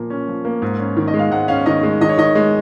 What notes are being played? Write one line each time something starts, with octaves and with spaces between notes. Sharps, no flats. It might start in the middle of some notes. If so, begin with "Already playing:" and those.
Already playing: A#2 F3 A#3
C#4
F3
A#3
G#2
C#4
D#3
D#5
G#3
F5
G#2 F#5
C#4 F5
D#3 D#5
G#3
D#3 D#5
C#5
D#3 D#5
G#3